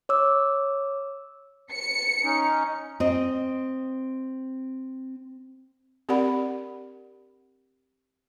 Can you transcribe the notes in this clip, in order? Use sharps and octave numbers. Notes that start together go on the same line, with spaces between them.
C#5 D6 E6
C#7
C#4 D#4
C4 D#5
C4 G4 A#4 D5 F#5 B5